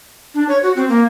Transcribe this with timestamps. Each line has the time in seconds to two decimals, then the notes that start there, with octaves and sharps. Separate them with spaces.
0.34 D4
0.49 C#5
0.63 F#4
0.76 C4
0.89 A#3